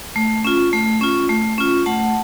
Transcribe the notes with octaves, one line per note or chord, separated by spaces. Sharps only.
A3
C#4 F4
A3
C#4 F4
A3
C#4 F4
A3 F#5 A5